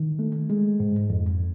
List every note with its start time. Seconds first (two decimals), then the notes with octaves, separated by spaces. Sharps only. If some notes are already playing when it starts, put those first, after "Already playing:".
Already playing: D#3
0.19 A3
0.50 G#3
0.80 G#2
1.10 F2